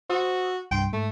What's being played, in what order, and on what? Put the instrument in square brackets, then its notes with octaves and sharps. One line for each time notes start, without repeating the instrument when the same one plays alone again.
[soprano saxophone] F#4 [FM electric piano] C5 D#6 E6
[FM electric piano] C2 G2 C6 [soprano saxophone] G5
[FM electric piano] G#2 [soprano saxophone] A3